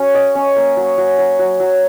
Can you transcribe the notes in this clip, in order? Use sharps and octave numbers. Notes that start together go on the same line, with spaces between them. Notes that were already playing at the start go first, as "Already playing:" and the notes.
Already playing: C#4 F#4
D#5
C#4
A#3
F#3
F#3
F#3
F#3
F#3